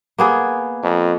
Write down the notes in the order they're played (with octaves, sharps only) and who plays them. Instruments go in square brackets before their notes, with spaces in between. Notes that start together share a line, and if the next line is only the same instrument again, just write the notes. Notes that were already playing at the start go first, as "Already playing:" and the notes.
[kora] A#3 B3 G#4
[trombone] F2